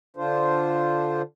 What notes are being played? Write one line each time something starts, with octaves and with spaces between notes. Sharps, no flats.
D3 D4 F4 C5